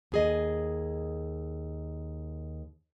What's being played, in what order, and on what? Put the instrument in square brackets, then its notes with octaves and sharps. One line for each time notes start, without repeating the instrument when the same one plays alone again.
[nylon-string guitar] D#2 G#4 D#5